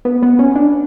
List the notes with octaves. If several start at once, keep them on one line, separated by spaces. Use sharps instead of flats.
B3
B3
C#4
D4